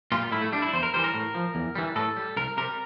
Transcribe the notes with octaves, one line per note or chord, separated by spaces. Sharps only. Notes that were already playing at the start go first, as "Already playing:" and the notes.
A#2 G3 F4
A2 E4
A3
G3 D4
E4
E2 C5
A#4
E3 G3 C5
A#4
A2
F3
E2
E3 G3
A2 A4
G3
C2 A#4
C3 G3 A#4